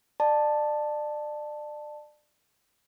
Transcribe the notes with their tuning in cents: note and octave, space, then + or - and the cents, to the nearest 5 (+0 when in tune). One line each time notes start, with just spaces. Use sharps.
D5 +30 A5 +0